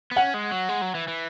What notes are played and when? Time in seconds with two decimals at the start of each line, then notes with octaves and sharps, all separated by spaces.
0.11 B3
0.16 C#4 F#5
0.34 G#3
0.52 F#3
0.69 G#3
0.82 F#3
0.95 E3
1.08 E3